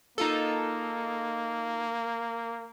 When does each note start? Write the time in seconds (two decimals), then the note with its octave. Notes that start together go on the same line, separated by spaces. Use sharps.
0.18 A#3 D#4 F4 A4